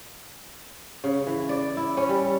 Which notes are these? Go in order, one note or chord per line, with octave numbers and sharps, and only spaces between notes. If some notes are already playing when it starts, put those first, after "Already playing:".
C#3
E3
D5
E4
C#4
G3